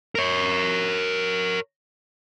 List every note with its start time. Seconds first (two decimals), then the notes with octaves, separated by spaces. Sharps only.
0.15 A#4 C#5